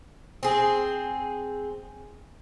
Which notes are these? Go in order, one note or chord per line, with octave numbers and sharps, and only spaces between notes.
C4 G#4